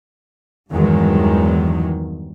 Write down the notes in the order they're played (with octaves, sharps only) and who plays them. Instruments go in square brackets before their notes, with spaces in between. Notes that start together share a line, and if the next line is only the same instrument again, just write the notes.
[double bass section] E2 G2 D#3 F#3 G#3